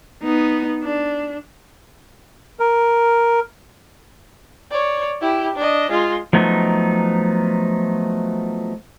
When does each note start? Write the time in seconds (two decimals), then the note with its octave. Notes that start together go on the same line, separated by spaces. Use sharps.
0.23 B3 D#4
0.83 D4
2.60 A#4
4.71 C#5 D5
5.21 E4 G4
5.56 D4 D#5
5.90 G#3 F4
6.33 F3 F#3 A3 B3 D#4